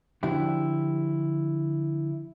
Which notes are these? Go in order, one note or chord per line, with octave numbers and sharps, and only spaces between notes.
D3 F3 D4 E4 F#4 G4